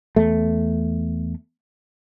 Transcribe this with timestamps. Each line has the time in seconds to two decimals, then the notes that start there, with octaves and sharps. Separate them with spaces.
0.16 E2 A3